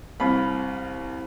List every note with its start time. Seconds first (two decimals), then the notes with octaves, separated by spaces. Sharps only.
0.20 C2 F5 B5